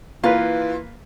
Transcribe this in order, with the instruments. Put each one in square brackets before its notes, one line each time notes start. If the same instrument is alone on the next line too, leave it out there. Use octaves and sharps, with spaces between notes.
[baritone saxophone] E3 [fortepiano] A#3 B4 [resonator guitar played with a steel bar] F4